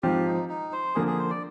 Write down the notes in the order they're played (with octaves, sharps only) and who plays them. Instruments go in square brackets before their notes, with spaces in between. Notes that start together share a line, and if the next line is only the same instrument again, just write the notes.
[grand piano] G#2 F3 C4 F4 [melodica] G4
[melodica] D#4
D#4
C5
[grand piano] D3 F3 A#3 [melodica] G#4
[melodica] G#4
C5
D5